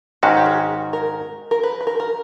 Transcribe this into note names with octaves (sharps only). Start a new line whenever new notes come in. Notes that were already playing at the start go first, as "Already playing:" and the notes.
G#2 D#3 G#3 C#4 F#4 G4
G4
G#4
A#4
A#4
B4
B4
A#4
A#4